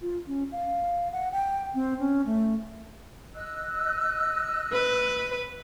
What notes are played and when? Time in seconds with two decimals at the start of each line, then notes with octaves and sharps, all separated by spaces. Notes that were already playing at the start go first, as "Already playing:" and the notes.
0.01 F4
0.27 C#4
0.52 F5
1.12 F#5
1.32 G5
1.74 C4
1.99 C#4
2.26 A3
3.35 D#5 E6 F#6
4.73 B4